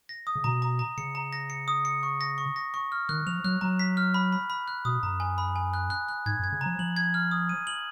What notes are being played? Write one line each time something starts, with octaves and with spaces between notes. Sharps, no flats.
A#6
D#6
C#3
B2 A#5
A#5
A#5
C#3 C#7
A#5
A#6
C#7
D#6
C#7
C#6
A#6
C#6
A#6
C#6
F6
D#3 F#6
F3 F7
F#3 F#6
F#3 A#5
B6
F6
B5
B5
B5
F#6
B2 D#6
F#2 A#5
G#5
B5
G#5
F#6
F#6
F#6
G#2 G#6
F#2 G#6
C#3
F3 A#5
F3 F#7
G#6
F6
D#6
D#7
F#7